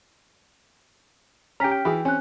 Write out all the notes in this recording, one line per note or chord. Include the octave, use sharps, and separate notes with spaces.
C#4 G4 G5 G#5 A#5 F6 B6
G5
E3 E4 F#4 G#4
C4 C#4 G#5 F#6